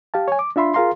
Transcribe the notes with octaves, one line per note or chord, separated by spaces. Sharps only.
G4 F5 A5
C#5 G#5
D6
D4 F4 E5 B5 C6
F4 G#4 A#4 F5 A#5 C6